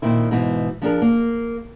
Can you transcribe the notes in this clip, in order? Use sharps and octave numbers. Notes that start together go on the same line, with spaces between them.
A#2 D#3 C4 E4
G#2 B2 E3
F3 D4 G#4 A#4
A#3